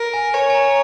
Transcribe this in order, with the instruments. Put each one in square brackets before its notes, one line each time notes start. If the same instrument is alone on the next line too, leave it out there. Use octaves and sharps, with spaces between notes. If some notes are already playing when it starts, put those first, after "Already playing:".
Already playing: [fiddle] A#4
[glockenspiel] G#5
[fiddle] C#5 [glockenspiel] G#5
[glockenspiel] G#5
A#5